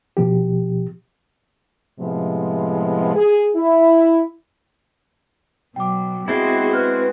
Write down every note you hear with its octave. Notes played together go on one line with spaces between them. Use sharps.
B2 F3 G4
A2 C3 F3 G#3 B3
G#4
E4
B2 F#3 G5 D6
G#3 B3 C4 E4 F#4 G#4
B4 F6 F#6